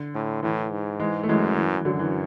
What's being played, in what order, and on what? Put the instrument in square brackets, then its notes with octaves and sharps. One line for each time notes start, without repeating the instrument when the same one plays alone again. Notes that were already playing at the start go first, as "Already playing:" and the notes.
Already playing: [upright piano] D3
[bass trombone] A2
[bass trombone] A2 [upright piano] E3
[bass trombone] G#2
[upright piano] E3 G#3
A3
[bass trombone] F#2 [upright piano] E3 G#3
[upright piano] E3
E3
[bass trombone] F#2 [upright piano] D3 F#3
[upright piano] E3